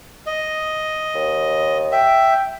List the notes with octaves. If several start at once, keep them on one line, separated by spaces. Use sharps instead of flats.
D#5
D#2
E5 G5